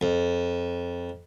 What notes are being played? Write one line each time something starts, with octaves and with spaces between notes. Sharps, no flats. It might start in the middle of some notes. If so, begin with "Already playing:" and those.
F2